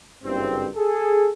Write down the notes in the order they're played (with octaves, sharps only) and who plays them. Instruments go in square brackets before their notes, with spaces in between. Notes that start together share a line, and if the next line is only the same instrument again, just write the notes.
[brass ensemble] F#1 G2 C4
G#4 A4